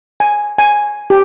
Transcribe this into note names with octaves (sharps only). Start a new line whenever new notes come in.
G#5
G#5
G4